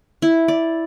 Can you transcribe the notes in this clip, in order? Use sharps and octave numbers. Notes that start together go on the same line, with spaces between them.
E4
D5